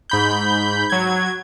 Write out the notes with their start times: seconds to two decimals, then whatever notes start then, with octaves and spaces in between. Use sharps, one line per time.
0.10 G#2 B5 G6
0.90 F#3 G#6